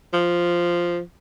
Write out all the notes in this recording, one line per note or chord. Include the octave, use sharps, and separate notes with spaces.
F3